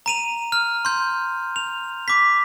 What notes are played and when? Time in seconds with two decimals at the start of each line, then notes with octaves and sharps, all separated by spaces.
0.06 A#5 D#7 F7
0.52 F6
0.85 C6 G6
1.56 F7
2.08 D6 B6